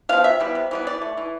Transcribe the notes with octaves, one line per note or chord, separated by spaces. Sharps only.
F3 B3 F5
C3 E5
E3 G3 B3
C3
E3 G3 B3
E3 D5
A3
E3